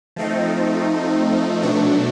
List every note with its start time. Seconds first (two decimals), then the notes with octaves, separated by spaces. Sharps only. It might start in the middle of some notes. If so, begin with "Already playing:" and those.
0.16 F3 A3 C4 D#4
1.62 B2 F#3 A3 D4